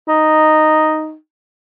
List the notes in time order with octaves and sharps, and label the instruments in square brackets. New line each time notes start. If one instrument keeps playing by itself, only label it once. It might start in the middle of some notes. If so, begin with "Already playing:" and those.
[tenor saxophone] D#4